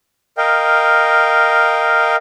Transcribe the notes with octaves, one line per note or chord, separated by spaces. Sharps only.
A#4 D#5 F5 G5